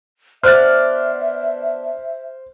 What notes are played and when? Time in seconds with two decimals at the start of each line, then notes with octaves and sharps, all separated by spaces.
0.43 B3 D4 C5 D5 E5 F6 F#6 A6